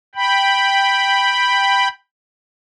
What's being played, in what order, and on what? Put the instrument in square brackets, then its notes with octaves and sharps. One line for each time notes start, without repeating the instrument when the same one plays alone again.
[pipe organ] G5 B5